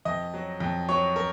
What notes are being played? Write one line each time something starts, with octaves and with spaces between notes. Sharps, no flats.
F2 D#5
F#3
F2
F#3 C#5
A#4